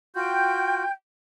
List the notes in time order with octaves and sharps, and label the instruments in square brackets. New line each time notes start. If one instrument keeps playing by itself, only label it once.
[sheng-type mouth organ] F4 F#4 [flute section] G5 G6